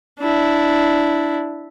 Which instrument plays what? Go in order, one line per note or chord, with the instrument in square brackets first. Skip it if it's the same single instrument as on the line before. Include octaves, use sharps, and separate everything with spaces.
[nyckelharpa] D4 E4